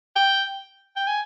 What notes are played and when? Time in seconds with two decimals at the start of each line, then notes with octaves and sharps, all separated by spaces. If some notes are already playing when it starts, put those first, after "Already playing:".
0.16 G5
0.96 G5
1.07 G#5